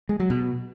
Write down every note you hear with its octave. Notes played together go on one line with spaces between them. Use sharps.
G#3
F#3
B2